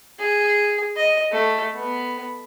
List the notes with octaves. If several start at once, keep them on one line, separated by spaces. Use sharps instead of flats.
G#4
D#5
A3
B3